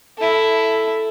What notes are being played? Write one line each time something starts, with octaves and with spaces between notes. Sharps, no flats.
E4 A4